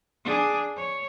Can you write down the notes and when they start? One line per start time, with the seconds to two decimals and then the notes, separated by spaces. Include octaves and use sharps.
0.25 D4 G#4
0.76 C#5